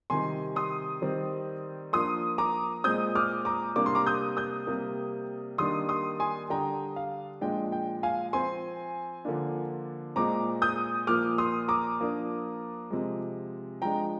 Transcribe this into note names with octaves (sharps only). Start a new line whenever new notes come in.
C3 D#3 G3 G#5 C6
C6 D#6
D#3 G3 C4
F3 A#3 D4 C6 D#6
A#5 D6
A#2 G#3 C4 D#6 G6
D6 F6
A#5 D6
C3 G3 A#3 D4 D6
C6
A#5 D6
D#6 G6
D#6 G6
C3 G3 A#3
D#3 G3 A#3 D4 C6 D#6
C6 D#6
G#5 C6
D3 G3 D4 G5 A#5
F5
A#2 F3 G#3 D4 G5
G5
F5 G#5
F3 C4 G#5 C6
D3 F3 A#3 D4
A#2 G#3 C4 A#5 D6
D#6 G6
A#2 F3 A#3 D6 F6
C6 D#6
A#5 D6
F3 A#3 D4
C3 F3 G#3
F3 G#3 D4 G5 A#5